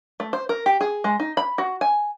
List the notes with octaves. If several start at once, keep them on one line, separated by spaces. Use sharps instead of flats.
A3
C5
A#4
G4
G#4
G#3
D#4
B5
F#4
G#5